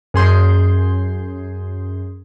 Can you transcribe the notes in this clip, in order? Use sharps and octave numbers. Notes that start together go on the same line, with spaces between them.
F#2 G#4 C6 G6